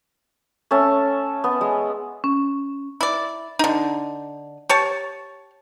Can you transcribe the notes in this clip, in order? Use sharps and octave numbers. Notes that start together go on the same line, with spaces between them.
A3 C#4 E5 A5
B3
G#3
C#4
E4 D5
D3 D#4
G4 C#5 A5